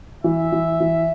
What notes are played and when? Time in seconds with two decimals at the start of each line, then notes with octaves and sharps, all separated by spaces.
0.24 E3 E5
0.52 E3
0.80 E3